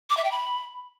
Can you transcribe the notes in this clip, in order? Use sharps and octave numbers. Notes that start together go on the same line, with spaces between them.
D6
E5
G5
B5